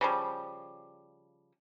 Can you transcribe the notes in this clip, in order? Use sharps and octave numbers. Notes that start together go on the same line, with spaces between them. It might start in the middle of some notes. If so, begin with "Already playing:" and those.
C#3 F3 G3